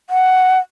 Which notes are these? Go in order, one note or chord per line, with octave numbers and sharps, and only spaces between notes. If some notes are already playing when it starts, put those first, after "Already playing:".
F#5